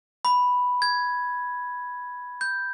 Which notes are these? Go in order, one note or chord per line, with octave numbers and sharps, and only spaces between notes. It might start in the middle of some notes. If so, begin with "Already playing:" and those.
B5
G#6
G6